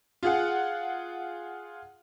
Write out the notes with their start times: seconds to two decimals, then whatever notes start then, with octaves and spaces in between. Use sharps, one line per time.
0.23 F4 G#4 F#5